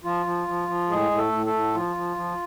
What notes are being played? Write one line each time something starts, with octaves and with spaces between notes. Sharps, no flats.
F3 F4
F3
F3
F3
A2 G#3 G#4
A2
A3 A4
A2
A3 A4
A2
F3 F4
F3
F3